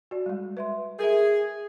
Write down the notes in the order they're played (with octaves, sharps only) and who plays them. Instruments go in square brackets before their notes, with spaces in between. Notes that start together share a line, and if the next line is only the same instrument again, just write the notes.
[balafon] F#4 D5
G3 G#3
B4 E5 C6
[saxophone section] G#4 [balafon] A#4 E5